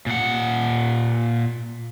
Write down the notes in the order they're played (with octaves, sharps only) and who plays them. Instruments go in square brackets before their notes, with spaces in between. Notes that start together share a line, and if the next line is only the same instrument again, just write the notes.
[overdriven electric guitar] A#2 F#5